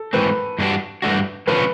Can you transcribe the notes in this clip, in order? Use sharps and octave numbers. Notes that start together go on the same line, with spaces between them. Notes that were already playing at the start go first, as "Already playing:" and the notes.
Already playing: A4
G#2 E3 A3 C4 B4
G2 E3 A3 D4 F#4
G2 E3 A3 D4 F#4
D3 F3 A3 C#4 B4